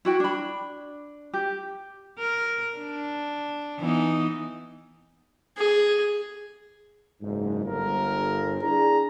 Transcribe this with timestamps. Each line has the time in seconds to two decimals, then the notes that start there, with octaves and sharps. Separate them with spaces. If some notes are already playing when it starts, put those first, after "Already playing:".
0.05 E4 F#4 G5
0.20 D4 B5
1.34 G4
2.19 A#4
2.78 D4
3.80 E3 B3 D#4
5.57 G#4
7.22 F#1 G#2
7.65 G1 A#4
8.62 D4 E4 G#4 A#5